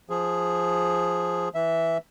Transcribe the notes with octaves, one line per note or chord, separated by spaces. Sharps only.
F3 G#4
E3 E5